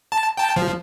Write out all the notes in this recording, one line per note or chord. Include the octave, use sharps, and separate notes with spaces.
A5
G5 A5
F3